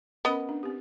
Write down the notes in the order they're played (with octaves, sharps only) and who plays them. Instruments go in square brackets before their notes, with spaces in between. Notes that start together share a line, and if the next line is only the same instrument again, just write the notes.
[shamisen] B3 D#5 [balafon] C#4 A#4 B5
[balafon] D4
C4 G4